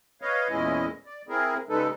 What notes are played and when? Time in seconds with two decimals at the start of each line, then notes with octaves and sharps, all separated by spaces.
0.22 B4 C#5 D#5 F5
0.49 E2 A#2 G#3 C#4 E4 D#5
1.06 D5
1.28 C4 E4 G#4 A#4
1.69 C#3 G3 G#3 D#4 A4 B4